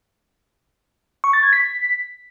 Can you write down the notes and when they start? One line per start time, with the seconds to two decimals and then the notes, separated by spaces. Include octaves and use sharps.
1.24 C#6
1.33 A6
1.43 G#6
1.53 B6